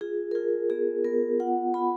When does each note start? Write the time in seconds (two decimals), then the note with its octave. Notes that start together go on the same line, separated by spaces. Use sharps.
0.01 F4 G#4
0.31 A#4
0.35 F4 G#4
0.70 B3 G#4
1.04 B3 A#4
1.40 F4 F#5
1.74 F4 B5